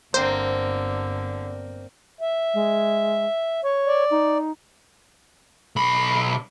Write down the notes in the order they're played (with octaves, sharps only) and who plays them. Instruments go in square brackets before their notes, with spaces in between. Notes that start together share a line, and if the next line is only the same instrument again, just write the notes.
[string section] G1 [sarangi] D3 [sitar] A#3 C4 [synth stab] C5
[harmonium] E5
[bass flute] G#3
C#5
[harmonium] D5
[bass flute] D#4
[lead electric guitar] B1 B5